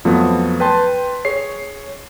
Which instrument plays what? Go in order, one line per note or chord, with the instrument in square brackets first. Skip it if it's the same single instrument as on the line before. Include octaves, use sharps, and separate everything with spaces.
[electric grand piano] F2 F3 F#3 A3 B3
B4 G5 A5 C6
G#4 C#5 C7